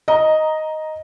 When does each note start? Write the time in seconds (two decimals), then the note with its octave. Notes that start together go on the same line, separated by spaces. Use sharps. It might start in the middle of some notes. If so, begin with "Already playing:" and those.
0.08 D#5 A#5